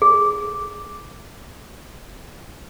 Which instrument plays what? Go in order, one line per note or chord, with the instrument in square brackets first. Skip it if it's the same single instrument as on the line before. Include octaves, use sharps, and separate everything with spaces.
[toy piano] G#4